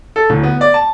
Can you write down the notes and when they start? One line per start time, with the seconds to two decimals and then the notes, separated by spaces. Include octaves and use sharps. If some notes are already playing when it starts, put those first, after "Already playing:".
0.16 A4
0.30 D1
0.43 B3
0.61 D5
0.74 A5